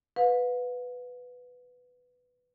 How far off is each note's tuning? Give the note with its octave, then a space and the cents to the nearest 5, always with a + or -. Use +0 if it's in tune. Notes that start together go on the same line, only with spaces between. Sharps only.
B4 +5 F5 +45